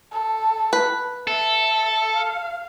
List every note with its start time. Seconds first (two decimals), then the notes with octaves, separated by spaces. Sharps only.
0.12 A4
0.73 B4
1.27 A4 E5
2.14 F5